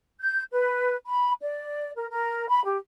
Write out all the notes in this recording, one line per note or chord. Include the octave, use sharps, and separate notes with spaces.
G6
B4
B5
D5
A#4
A#4
B5
G4